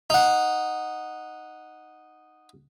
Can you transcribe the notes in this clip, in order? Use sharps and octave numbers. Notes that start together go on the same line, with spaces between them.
D#4 F#5